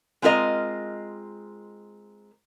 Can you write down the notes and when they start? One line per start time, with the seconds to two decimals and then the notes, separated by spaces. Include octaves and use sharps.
0.22 G#3 C4 F4 A#4 D#5